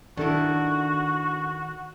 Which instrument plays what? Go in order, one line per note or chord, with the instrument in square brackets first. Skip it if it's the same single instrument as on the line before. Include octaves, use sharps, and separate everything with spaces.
[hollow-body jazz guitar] D#3 E4 [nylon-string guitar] D4 A4 [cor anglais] F#4